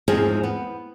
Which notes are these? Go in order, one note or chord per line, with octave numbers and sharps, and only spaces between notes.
E2 G#2 F3 C4 G#4
B3